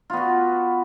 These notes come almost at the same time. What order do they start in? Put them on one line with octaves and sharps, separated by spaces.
F4 B3 F#4